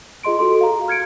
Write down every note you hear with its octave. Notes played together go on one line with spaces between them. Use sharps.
F4 G#4 D#5 C6 D7
F#4 A4 C6
F5 A#5
F6 G#6 C#7 D7